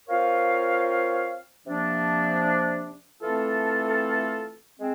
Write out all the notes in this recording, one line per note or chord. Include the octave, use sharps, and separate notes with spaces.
C4 F4 A#4 C#5 F5
C3 F3 A#3 D4
E3 A3 C4 F4 A4
G#3 C4